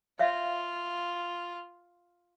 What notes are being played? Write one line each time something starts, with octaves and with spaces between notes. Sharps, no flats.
F4 C#5 E5 F5